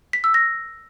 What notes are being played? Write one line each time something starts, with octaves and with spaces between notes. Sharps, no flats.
B6
E6
A#6